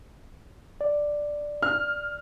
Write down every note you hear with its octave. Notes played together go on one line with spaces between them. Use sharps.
D5
F6